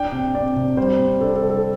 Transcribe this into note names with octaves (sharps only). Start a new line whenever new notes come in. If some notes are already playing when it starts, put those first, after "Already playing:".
Already playing: D4 G5
C3
C3 D5
C3
G3 C5
C3
D4 A4
A4
G3
A4